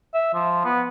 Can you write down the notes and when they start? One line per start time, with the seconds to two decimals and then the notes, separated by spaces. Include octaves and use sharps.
0.14 E5
0.34 F3
0.65 B3